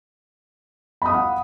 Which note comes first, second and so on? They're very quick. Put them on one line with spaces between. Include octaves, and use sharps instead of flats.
B5 D#6 F5 F#5